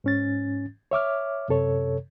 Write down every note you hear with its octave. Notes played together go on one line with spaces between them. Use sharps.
G#2 C#4 A6
C#5 E5 D6 F6
F#2 C3 A4 C#5